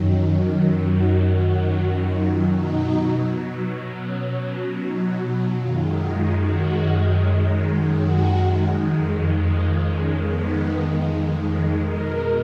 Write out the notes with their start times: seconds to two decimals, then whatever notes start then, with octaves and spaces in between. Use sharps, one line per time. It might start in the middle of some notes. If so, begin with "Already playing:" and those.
Already playing: F#2 D#3 F#3
0.91 F#4
1.29 F#4
1.69 F#4
2.07 F4
2.47 B2 F#3 D#4
4.03 C#4
4.41 C#4
4.81 D#4
5.58 F#2 D#3 G#3 F4
5.96 F4
6.36 F#4
7.92 F#4
8.70 F2 D#3 G#3
9.48 F4
9.86 C#4
10.25 B3
11.80 B2 G#3 A#4